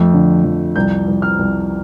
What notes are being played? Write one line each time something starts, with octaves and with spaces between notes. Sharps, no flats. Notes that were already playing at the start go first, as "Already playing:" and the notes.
Already playing: F2 A3
D3
F2
C2 G6
C2
F6
C2